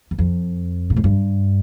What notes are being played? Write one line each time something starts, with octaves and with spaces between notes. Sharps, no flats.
E2
F2
A#2
A2
G2